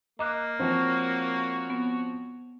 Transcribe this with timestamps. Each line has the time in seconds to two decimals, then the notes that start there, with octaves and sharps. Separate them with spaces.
0.19 A#3 D#5 A#5 D6 F#6
0.59 F3 C4 F#4 C#5
1.70 B3